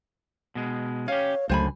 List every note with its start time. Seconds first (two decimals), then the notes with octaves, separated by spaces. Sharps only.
0.55 B2 G#3
1.08 C#4 G4 C#5 F5
1.49 C#2 F#2 D3 F#3 A3 C5 G#5 B5